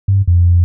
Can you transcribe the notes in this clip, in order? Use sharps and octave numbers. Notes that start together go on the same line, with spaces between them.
G2
F2